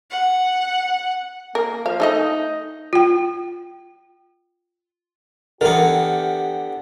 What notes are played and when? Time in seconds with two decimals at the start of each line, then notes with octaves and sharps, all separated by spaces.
0.11 F#5
1.55 A#3 A#4
1.86 F3 F5
2.00 A3 D#4 A4 D#5
2.93 F4 G5
5.61 D3 E3 B3 G4 A#4